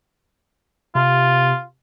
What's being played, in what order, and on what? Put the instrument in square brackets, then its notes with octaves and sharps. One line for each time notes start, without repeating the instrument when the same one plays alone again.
[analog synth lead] C3 [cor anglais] F4